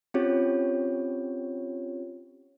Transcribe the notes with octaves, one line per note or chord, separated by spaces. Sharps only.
C4 C#4 F4 G4 C#5